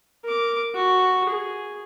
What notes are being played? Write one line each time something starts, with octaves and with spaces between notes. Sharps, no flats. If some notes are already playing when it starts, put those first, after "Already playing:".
A#4 D6
F#4
G#4